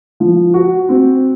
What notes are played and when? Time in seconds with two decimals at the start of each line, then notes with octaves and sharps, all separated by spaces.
0.20 F3
0.54 F#4
0.89 C4